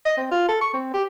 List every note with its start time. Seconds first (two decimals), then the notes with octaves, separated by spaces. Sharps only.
0.05 D#5
0.17 C4
0.31 F4
0.48 A4
0.61 C#6
0.73 C4
0.94 G4